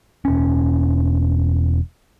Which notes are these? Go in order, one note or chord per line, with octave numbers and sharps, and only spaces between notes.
E1 C#4